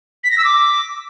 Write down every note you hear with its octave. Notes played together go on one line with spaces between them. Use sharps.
B6
A#6
E6
D6